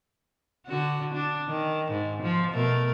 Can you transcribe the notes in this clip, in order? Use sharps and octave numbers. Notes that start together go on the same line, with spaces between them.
D3 F#4
D4
D#3
G#2
F3
B2 A3 A#4